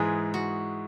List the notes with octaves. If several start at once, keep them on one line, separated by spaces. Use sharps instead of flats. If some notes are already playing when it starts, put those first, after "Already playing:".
Already playing: G#2 E3 G#3 G#4
F#4